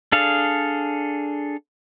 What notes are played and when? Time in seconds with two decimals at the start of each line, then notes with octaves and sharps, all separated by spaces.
0.12 D4 G#4 A4 F5